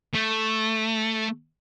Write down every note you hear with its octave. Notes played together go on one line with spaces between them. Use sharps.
A3